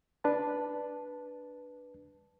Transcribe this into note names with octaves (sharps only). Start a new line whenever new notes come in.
D4 B4 A5